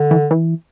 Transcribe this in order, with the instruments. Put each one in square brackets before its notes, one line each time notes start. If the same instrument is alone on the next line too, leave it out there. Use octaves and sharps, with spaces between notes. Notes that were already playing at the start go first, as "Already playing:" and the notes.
Already playing: [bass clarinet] D3
[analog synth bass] E3
E3